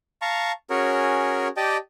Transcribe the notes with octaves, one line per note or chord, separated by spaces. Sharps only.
F5 A5 A#5 C#6
C#4 F#4 G#4 A#4 C#5
G4 D5 D#5 G5 A5